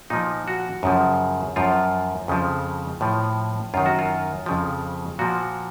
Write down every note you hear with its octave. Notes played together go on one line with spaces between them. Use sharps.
A#2 F3 D#4
F#4
F#2 C#3 F3
F#2 F3 F4
F2 C#3 F3
A2 F3
F#2 D#3 F4
F#4
F4
F2 C#3 F3
A#2 F3 F#4